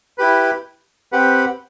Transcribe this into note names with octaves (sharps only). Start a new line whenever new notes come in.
E4 G4 B4
C4 G4 B4 F#5